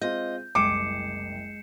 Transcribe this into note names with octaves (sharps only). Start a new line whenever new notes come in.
G#3 C4 F4 D#5 G6
F#1 C2 G#3 G5 D6 C7 C#7 E7